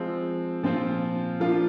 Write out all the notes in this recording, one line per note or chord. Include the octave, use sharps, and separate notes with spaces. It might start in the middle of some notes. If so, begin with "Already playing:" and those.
Already playing: F3 G#3 C4
A#2 F3 C4 F4
F3 A#3 D4 F4